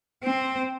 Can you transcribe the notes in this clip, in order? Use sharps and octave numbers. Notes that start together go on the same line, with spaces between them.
C4